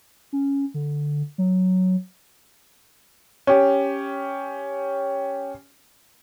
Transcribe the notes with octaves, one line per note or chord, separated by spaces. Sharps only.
C#4
D3
F#3
C#4 G4